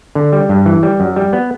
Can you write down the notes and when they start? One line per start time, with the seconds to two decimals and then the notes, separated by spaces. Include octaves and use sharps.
0.15 D3
0.32 G3
0.49 G2
0.66 E3
0.83 G3
1.00 F#2
1.16 G3
1.33 B3